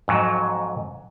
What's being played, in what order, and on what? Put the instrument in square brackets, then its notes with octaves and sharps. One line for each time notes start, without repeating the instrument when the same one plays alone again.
[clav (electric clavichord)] F2 G#2 F#3